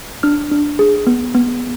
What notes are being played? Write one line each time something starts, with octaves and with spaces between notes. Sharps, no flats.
D4 F6
D4
G#4
B3
B3